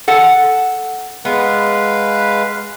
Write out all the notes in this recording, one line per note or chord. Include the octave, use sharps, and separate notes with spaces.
A4 F#5
G#3 B3 B4 F5